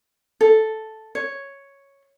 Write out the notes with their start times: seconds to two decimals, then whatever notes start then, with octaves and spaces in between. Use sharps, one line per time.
0.41 A4
1.15 C#5